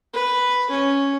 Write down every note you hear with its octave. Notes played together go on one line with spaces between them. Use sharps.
B4
C#4